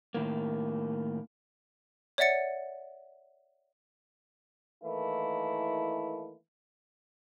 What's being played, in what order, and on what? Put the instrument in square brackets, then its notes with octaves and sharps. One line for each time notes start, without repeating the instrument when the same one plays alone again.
[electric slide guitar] A2 D#3 A#3
[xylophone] C#5 D5 E5 F#5 A6 C#7
[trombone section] D#3 E3 A3 A#3 E4